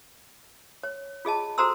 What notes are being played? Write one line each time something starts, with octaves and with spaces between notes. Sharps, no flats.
C#5
F4 G#4 D#5 A5
F#4 A4 C5 A#5 C6 E6